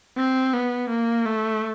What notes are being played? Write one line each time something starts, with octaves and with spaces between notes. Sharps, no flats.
C4
B3
A#3
A3